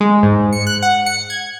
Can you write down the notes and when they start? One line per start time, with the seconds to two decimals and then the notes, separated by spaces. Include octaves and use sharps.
0.01 G#3
0.23 G#2
0.53 C#7
0.67 F#6
0.82 F#5
1.06 C#7
1.30 G#6